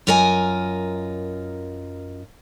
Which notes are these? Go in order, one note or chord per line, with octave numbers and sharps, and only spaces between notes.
F#2 F4 A#4 D#5 G#5